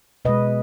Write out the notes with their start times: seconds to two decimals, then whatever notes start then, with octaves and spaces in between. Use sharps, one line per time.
0.25 B2 G#3 B4 D#5